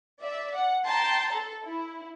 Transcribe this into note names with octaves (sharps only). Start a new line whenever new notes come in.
D5 E5
F#5
G5 A5 A#5 C6
A4
E4